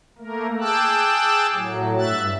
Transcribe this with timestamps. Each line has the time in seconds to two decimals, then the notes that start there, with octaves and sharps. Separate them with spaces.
0.18 A3 A#3 A#4
0.60 G#4 G5 A5 D6 E6 F#6
1.54 A2 F#3
1.98 G2 E5 F#6 A6